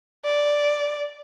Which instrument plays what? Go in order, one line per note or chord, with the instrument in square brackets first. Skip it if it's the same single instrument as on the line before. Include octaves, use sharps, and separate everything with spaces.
[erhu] D5